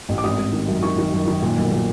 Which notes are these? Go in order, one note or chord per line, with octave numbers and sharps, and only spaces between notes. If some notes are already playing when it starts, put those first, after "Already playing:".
A1
D6
G#1 D#6
G#1
D#3
F#2
D#3 C#6
D#3
F#2
D#3
A#2
B1
A#2